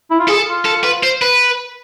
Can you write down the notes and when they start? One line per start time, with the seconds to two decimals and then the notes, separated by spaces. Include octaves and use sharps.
0.10 E4
0.19 F4
0.28 G#4 A4
0.47 F4
0.65 A4
0.84 B4
1.03 C5
1.22 B4